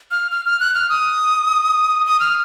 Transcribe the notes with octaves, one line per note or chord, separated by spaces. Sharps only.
F6
F6
F6
F#6
F6
D#6
D#6
F6